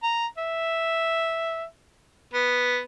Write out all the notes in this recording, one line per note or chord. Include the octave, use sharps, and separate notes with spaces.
A#5
E5
B3